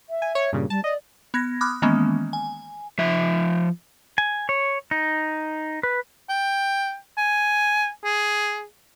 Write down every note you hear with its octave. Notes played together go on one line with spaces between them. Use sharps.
E5
G#5
C#5
G2 A#2 C#3
G3 A5
D5 D#5
B3 G#6 A#6
B5 D6 D#6 F6 F#6
D#3 E3 G#3 A#3 B3 C#4
G#5
F3 E5
G#5
C#5
D#4
B4
G5
G#5
G#4